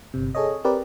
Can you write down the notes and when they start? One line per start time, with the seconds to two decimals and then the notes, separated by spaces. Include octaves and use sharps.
0.14 G1 C3
0.35 G#4 A4 C#5 D#5
0.64 C4 G4 A#4 B4 D5